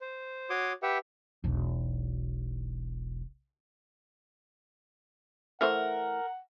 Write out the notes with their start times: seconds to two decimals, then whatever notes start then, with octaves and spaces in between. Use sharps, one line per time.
0.01 C5
0.50 F#4 C#5 C6 D6 D#6
0.83 G4 B4 E5 F#5 G5
1.44 E1 B1
5.61 E3 A3 A#4 C5 F#5